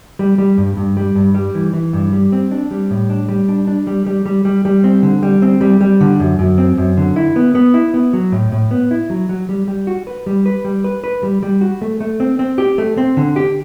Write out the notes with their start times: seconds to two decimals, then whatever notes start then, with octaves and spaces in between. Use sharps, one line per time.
0.19 G3
0.38 G3
0.57 G2
0.77 G2
0.97 G3
1.15 G2
1.35 G3
1.55 E3
1.74 E3
1.93 G2
2.12 G3
2.32 C4
2.51 D4
2.71 G3
2.91 A2
3.10 D4
3.29 G3
3.49 D4
3.67 D4
3.87 G3
4.06 G3
4.26 G3
4.45 G3
4.65 G3
4.84 C4
5.03 D3
5.23 G3
5.42 C4
5.61 G3
5.81 G3
6.01 D3
6.20 F#2
6.39 F#2
6.58 C4
6.78 F#2
6.97 D3
7.16 E4
7.36 B3
7.55 B3
7.74 E4
7.94 B3
8.13 F#3
8.32 A2
8.52 A2
8.71 B3
8.91 E4
9.10 F#3
9.29 F#3
9.49 G3
9.68 G3
9.87 F#4
10.07 B4
10.26 G3
10.46 B4
10.65 G3
10.84 B4
11.04 B4
11.23 G3
11.43 G3
11.61 F#4
11.82 A3
12.00 A3
12.20 C4
12.39 C4
12.58 G4
12.78 A3
12.98 C4
13.17 D3
13.36 G4